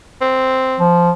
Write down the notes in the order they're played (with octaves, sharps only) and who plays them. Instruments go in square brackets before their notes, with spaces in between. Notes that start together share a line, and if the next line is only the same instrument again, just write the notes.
[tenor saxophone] C4
[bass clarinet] F3